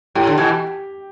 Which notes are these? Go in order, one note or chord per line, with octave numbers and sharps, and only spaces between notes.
A2 G4
D3
B2 E3